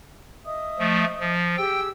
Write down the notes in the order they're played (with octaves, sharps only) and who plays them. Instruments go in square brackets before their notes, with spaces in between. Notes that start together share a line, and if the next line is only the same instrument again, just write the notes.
[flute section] D#5 E5 D#6
[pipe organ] F3 A3
F3
[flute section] G4 G#4 E6 [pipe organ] G5